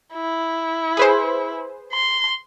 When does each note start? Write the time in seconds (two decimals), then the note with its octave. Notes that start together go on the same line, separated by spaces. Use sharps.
0.14 E4
0.97 G#4 B4 C5
1.93 C6